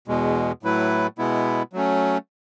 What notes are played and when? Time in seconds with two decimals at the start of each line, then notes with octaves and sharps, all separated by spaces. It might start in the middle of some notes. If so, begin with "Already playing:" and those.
0.08 E2 B2 G#3
0.63 A2 F#3 A3 E4 B4
1.18 B2 G#3 B3 E4
1.73 F#3 A3 C#4